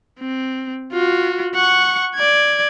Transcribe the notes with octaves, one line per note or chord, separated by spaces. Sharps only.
C4
F4 F#4
F#5 C#6
D5 G#6